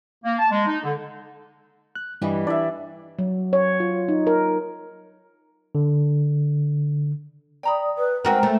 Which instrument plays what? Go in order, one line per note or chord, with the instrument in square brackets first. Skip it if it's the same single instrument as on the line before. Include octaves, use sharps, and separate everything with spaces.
[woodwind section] A#3
A5
G#3
D#4
D3
[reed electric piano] F#6
[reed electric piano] G2 D#5 [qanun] E3 G3
[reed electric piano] D4 E4 [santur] D5 E5
[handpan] F#3
C#5
F4
D#4
A#4
[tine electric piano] D3
[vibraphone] D5 D#6 [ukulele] G5 A#5 B5
[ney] B4
[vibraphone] G#3 A#5 [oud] C4 F#4 A#4 [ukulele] D#4 B4 [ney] G5
[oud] A3 [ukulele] F#4 C5 C#5